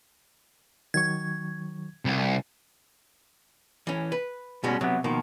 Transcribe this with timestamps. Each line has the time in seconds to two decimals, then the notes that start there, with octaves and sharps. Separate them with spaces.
0.94 D#3 F#3 C#6 G#6
2.05 C2
3.87 E3 C#4
4.12 B4
4.64 B2 G3 G#3 C#4 F#4
4.81 C3 F#3 B3
5.04 B2 D#3 F3 A#3